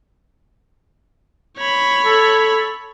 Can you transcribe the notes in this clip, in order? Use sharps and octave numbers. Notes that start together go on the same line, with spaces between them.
C#5 B5
A4